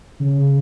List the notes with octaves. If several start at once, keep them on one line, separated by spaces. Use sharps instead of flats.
C#3